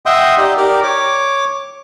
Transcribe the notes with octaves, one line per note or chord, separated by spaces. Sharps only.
D#5 E5 F#5 G5 C6 D#6
D#4 G4 D5
G4 A#4 D5
C#5 D6